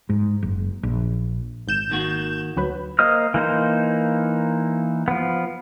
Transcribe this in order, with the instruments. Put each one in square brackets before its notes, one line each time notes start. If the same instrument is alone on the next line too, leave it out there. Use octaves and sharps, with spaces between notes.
[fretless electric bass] G#2
F#1
A#1
[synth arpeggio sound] G#1 G6 E7
[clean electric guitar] D#3 A#3 F#4
[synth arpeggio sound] D2 F#3 B4
[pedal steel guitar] A#3 C5 D#5 D#6 F6
E3 A#3 D#4 C5
F3 B3